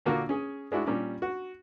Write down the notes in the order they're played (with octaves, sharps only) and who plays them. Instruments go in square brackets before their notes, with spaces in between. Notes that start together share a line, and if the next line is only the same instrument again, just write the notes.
[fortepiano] A#2 D3 A#3 F4 F#4
C#4 G#4
G#3 D4 E4 F#4
A#2 G3 C#4 D6
F#4